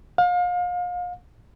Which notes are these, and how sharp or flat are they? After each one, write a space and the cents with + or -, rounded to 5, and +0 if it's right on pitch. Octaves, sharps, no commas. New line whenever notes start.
F5 +35